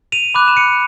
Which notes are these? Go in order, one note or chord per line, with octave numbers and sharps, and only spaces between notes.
D#7 F7
B5 D6 F#6
E7
C#7 D#7